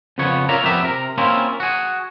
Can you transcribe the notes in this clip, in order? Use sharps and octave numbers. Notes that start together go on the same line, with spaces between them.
F2 C#3 F3 B3 C#5
A#4 C#5 D5 E5 F5 A#5
F2 B3 G4 E5
C3 A#4
A#3 C4 C#4 E4 F4
F#4 G#4